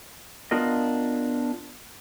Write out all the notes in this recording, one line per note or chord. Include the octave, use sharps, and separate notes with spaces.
B3 D4 F4 A#4 D#5